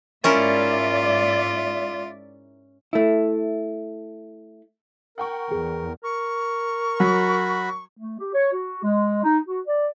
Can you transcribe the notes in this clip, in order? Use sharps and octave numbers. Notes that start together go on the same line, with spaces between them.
G#2 C#4 E4 F4 A#4 D5 E5
A3 E4
A#4 F#5 G5 C#6
E2 G#4
A#4 C#6
F#3 F#4 B5
A3
G4
C#5
F#4
G#3
D#4
F#4
D5